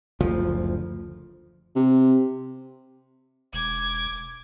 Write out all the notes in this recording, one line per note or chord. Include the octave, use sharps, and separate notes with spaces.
F#1 D2 F3
C3
E1 D6 G#6